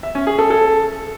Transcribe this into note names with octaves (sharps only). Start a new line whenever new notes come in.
E5
C#4
G#4
A4
A4